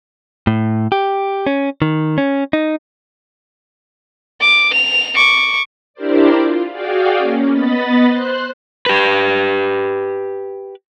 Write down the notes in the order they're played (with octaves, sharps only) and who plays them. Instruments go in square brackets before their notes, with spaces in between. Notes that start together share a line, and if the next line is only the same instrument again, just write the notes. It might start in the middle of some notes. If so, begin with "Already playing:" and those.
[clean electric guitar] A2
G4
C#4
D#3
C#4
D#4
[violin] D6
F7
C#6 D6
[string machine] D4 E4 G4 A#4 C5 D5
F4
F#4 G#4 D5 F5 G5
A#3 C#4
B3 D#5 B5 A6
C5 C6 F#6
[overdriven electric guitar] G4 B4